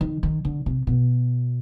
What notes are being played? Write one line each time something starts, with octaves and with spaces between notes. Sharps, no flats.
D#3
D#3
D3
C3
B2